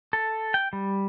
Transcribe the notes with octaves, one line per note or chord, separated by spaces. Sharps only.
A4
G5
G3